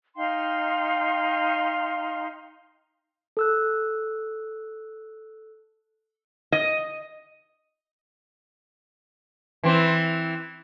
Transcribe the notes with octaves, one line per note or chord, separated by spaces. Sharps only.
D#4 F5 G5 C6
A4 E6 F#6
D#5
E3 C4